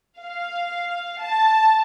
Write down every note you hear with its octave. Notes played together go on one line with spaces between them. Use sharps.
F5
A5